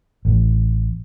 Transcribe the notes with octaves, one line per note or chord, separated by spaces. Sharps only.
A1